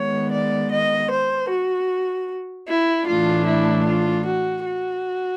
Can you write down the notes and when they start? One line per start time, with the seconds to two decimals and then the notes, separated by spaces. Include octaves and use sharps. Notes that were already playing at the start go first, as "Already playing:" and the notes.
Already playing: D#3 G#3 B3 C#5
0.31 D5
0.71 D#5
1.10 C5
1.49 F#4
2.68 E4
3.07 A2 E3 A3 D4 F4
3.47 E4
3.86 F4
4.26 F#4
4.65 F#4